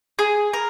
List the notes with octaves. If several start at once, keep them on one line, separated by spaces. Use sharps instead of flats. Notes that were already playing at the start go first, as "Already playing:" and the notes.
G#4
A#4